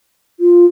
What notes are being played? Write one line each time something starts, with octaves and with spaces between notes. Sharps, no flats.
F4